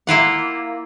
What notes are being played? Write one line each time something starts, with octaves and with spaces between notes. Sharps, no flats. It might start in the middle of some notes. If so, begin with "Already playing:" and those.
A#3 E4 F4 F#5